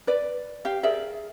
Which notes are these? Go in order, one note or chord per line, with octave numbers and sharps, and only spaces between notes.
B4 D5
G4 F5
G#4 A#4 D5 E5